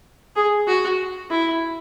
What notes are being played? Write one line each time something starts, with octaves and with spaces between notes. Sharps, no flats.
G#4
F#4
E4